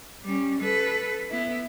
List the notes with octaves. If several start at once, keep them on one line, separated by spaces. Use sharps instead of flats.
G3 C#4
A4 B4
B3 E4